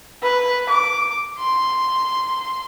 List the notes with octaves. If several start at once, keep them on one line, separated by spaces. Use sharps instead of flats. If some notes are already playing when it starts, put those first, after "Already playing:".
B4
D6
C6